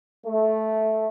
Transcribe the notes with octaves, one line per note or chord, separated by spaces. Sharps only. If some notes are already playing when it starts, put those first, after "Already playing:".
A3